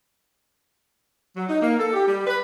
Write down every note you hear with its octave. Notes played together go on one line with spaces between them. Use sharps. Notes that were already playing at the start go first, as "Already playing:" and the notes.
F#3
D#4
A#3
A4
G4
G3
B4